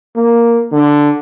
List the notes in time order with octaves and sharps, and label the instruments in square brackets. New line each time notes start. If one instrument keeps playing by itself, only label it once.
[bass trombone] A#3
D3